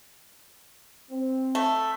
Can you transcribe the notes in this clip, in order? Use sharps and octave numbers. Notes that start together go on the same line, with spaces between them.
C4
A3